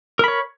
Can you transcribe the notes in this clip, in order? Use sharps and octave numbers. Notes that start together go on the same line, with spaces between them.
A#4 C#5 B5